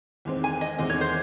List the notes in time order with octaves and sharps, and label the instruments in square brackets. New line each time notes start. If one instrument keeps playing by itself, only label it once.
[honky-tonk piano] E2 D#3 G#3 C4
[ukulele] G#5
D#5
[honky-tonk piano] E2 D#3 G#3 C4 [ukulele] D#5
[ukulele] C#5
C5